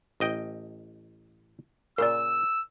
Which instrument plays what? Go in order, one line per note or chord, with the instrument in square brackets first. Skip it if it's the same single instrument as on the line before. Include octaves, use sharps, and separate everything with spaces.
[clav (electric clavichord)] A1 D#5 G5
[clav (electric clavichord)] A#2 C#3 [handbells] A#4 D5 [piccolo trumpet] E6